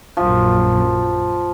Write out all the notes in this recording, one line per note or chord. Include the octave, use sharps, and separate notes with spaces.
A#1 F#2 F3